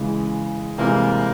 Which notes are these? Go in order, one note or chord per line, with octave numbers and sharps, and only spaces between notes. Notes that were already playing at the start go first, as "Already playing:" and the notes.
Already playing: C#3 E3 G#3
C3 E3 G3 G#3 A#3 C4